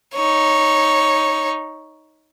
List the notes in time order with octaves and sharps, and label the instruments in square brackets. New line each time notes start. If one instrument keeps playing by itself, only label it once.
[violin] D#4 C#5